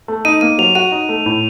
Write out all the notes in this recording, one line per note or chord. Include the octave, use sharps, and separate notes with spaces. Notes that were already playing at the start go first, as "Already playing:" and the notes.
A3
D#4 D#7
A#3 D#7
F#3 F7
F#4 D#7
D#4
A3
A2